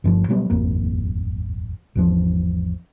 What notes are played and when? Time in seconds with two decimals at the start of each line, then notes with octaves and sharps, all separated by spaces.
0.04 G1 G2 F3
0.29 B2 F#3 G3 B3
0.50 D#1 G#1 F2 A#3
1.95 G#1 E2 F3